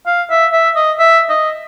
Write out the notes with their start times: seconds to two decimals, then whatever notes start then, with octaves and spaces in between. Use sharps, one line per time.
0.07 F5
0.30 E5
0.53 E5
0.76 D#5
0.99 E5
1.30 D#5